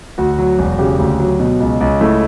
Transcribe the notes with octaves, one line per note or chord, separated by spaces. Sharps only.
D2 F#4
F#3
E1
C#3 G4
D2
F#3
B2
C#2
C#2
A3 E4